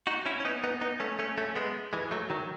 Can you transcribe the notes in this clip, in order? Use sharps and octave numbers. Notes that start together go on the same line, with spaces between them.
D#4 F#4
C#4 E4
C#4
B3 D#4
B3 D#4
B3 D#4
A3 C#4
A3 C#4
A3 C#4
G#3 B3
E3 G#3
F#3 A3
D#3 F#3